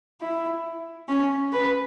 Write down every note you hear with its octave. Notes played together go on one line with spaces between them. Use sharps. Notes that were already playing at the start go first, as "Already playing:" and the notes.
E4
C#4
B4